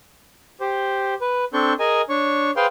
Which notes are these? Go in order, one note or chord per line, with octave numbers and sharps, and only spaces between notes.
G4 C5
B4
C4 D4 A4 C#6 G6
G#4 A#4 D#5 G#5
D4 C#5 C#6
G#4 B4 C5 F5 G5 C6